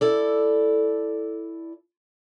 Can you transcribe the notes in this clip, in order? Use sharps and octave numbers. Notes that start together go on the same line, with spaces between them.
E4 A4 D5